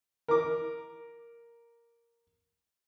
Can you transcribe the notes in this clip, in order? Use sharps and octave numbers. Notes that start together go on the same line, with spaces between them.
A#4 D6